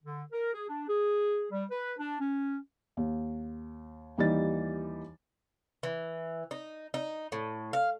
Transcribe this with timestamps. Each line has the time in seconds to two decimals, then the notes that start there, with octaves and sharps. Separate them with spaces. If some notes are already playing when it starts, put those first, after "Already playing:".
0.03 D3
0.31 A#4
0.53 G#4
0.68 D4
0.87 G#4
1.51 G3
1.70 B4
1.98 D4
2.20 C#4
2.97 D#2
4.18 D#2 E3 G3 D#4 A6
5.83 E3
6.51 D#4
6.94 D#4
7.32 A2
7.73 F5